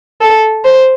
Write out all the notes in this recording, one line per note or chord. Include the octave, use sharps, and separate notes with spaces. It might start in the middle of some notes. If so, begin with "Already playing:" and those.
A4
C5